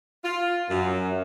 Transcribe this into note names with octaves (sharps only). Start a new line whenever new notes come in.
F4
F#2